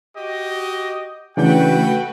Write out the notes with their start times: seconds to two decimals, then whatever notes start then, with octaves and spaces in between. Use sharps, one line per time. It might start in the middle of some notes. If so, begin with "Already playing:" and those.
0.17 F#4 G4 D#5
1.37 C#3 E3 A3 D4 F#4 B4 F#5 G5